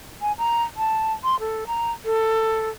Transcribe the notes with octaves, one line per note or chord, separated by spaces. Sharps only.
G#5
A#5
A5
C6
A4
A#5
A4